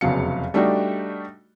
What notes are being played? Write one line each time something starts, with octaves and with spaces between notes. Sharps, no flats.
F1 E2 C#3 F#3 F5 C#7
G3 A3 D4 D#4 F#4 G4